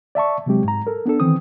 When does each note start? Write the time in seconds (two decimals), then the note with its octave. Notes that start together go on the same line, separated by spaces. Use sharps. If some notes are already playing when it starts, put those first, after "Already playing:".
0.15 D5 E5 A5 C#6
0.46 C3 F#3 G#3 C4 G4
0.64 G#2 A#5
0.87 A4 A#4
1.06 B3 D4 A4
1.20 D#3 E3 C4 D#6